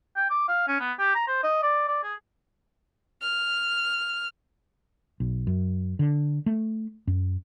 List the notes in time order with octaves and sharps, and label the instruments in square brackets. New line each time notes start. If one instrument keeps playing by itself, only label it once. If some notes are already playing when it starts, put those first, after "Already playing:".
[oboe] G5
D6
F5
C#4
B3
G4
A#5
C5
D#5
D5
D5
G#4
[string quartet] F6
[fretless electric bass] B1
F#2
D3
A3
F#2